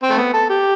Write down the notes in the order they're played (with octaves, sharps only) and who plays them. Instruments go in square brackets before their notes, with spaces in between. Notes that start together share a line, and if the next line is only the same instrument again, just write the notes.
[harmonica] C4
A3
B3
A4
G4